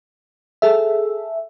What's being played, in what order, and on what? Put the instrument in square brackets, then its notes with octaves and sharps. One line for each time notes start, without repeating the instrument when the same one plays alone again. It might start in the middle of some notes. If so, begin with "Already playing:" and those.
[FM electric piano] G#4 A4 E5